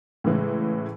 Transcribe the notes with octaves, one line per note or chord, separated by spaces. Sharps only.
A2 C#3 E3 G#3